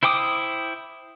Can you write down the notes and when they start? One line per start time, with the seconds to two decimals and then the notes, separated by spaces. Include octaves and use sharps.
0.03 E4 C5 G5 D6 D#6